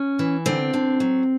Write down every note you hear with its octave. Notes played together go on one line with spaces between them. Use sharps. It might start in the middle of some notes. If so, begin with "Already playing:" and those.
Already playing: C#4
E3
D3 C4
D3
F#3